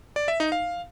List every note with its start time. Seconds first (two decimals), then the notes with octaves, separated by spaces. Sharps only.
0.16 D5
0.28 E5
0.40 D#4
0.52 F5